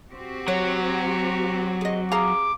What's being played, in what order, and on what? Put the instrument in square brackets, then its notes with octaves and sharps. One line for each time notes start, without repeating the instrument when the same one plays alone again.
[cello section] C4 F#4 G4
[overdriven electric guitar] F#3 [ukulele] C#5
[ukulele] G#4 D#5
[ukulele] G#4 F5 A#5 [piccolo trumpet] D6